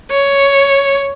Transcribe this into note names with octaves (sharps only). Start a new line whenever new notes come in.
C#5